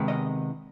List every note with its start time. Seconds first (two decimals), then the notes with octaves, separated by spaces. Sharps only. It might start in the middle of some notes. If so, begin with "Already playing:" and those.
Already playing: C3 D#3 G#3 B3
0.08 D#5